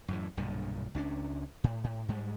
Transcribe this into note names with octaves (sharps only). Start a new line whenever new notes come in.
F#2 A2 E3
B1 G2 A#2 D3
C#2 C#4 D4
A2
A2
G#2 G3 G#3